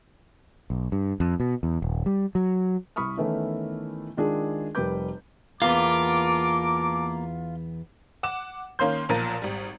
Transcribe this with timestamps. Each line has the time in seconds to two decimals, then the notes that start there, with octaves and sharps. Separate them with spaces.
0.70 B1
0.92 G2
1.20 F2
1.40 B2
1.63 E2
1.82 D#1
2.06 G3
2.35 F#3
2.96 C2 B5 C#6 D#6 F6
3.17 D#3 E3 A3 B3 C#4 E4
4.17 D#3 G#3 D4 F4 G#4
4.75 F1 G3 A#4 B4 D6 G6
5.62 E2 A#3 B3 F4 F5 A5 A#5 D6
8.23 F#5 D6 E7
8.79 D#3 A#3 C#4 F5 C6 G6
9.09 B1 A#2 F3 A#4 A6 D#7
9.42 G#1 G3